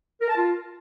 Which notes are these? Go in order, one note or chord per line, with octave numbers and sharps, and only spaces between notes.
A#4
A5
F4